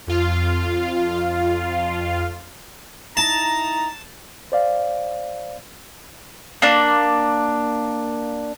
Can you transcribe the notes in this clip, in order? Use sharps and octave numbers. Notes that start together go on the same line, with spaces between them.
F2 F4 F5
D#4 E4 A5 A#5
C5 D5 F5
A#3 D4